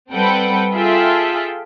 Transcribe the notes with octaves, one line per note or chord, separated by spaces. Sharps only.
G3 C4 A4 B4 F#5 G5
F4 G#4 A4 E5 G5